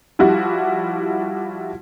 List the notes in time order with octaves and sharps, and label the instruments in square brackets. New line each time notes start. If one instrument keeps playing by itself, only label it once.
[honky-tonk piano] F3 G3 E4 F#4 G4